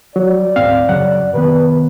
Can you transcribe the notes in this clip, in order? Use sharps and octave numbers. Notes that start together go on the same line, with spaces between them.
F#3 D5
D1 G#2 C4 F5
F#2 C#3 F#3 F#5
C3 D#3 B3 B4